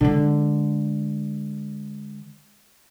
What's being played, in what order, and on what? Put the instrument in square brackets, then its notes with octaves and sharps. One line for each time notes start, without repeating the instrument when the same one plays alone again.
[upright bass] D3 G#3